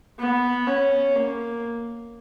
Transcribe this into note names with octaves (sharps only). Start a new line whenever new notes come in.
B3
C#4
A#3